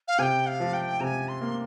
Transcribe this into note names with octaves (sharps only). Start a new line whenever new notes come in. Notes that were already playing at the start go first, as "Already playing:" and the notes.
F5
C3 G5 G#5
F5
F3
G5
C3 G#5 A#5
C6
A#3